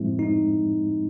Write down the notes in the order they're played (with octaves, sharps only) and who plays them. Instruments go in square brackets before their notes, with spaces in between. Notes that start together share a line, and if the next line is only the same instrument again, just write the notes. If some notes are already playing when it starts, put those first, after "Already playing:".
Already playing: [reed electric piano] A2 F3 G#3 C4 E4
[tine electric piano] D#4